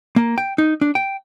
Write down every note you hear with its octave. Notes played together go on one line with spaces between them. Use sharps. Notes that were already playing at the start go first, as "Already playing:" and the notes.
A#3
G5
D#4
D4
G5